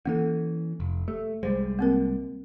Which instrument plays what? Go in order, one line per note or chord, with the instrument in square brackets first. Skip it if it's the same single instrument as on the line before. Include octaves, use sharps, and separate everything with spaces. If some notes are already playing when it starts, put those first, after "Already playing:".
[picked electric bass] E3 C#4 [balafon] A#3 A4
[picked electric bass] F1
[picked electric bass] A3 [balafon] G4
[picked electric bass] C2 G3 G#3 [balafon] C5
[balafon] A#3 C4 A#4